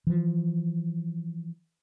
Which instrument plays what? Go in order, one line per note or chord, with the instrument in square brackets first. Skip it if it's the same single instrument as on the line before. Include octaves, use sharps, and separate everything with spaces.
[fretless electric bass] E3 F3